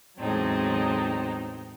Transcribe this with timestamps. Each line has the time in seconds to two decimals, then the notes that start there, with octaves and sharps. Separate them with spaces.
0.19 E2 A2 F#3 G#3 C4 D#4